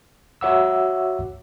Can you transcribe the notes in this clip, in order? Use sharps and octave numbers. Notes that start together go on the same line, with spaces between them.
F#4 C#5 E5 F#5 D6 E6